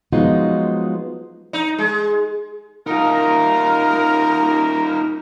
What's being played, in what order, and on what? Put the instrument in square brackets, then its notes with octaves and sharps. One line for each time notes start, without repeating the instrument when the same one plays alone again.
[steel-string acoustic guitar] F3 F#3 G#3 B3 D#4 F4
[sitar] D#4
G#3
[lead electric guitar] D#4 F4 [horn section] A#4